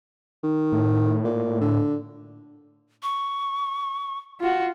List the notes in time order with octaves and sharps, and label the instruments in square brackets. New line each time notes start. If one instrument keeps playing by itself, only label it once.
[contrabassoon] D#3
[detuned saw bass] A2
[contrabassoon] A#2
D3
[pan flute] C#6
[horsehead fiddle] F4 F#4